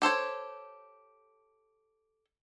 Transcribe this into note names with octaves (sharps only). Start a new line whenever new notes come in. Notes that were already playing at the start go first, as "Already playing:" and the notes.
G4 A4 C5 C#5